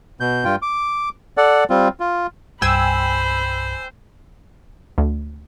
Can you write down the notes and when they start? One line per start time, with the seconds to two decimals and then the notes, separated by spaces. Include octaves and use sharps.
0.20 B2 G6
0.45 G2 F4 G5
0.62 D6
1.37 A4 D5 F#5
1.70 G3 C4 F4
2.00 F4
2.62 C2 G2 C5 G5 G#5 B5 E6
4.98 D2